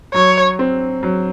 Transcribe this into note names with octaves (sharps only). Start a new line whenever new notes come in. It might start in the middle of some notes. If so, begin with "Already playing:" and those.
F#3 C#5
C4
F#3